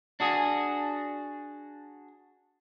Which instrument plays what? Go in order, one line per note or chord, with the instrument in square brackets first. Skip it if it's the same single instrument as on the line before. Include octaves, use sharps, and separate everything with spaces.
[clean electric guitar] D4 F#4 G#4